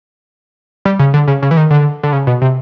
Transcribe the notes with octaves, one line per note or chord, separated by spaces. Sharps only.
G3
C#3
D3
C#3
C#3
E3
D#3
D3
D3
C#3
B2
C3